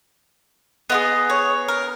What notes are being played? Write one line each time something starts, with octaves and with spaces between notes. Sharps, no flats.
B3 F4 G#4 D#5
C#5
A#4